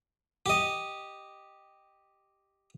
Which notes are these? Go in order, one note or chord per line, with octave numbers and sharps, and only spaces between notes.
G4 D#5